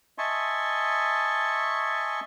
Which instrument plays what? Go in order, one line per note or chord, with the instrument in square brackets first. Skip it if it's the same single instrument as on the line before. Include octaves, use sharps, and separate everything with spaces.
[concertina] D#5 E5 G#5 A5 C6 C#6